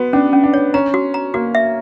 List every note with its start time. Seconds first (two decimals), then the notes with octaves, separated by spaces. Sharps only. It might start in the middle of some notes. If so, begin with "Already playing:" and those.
Already playing: B3 F#4
0.13 C#4 D4
0.33 C#4
0.44 D4
0.54 C#5
0.74 C#4 A#5
0.94 F#4
1.14 A#5
1.34 A#3 F#4
1.55 E5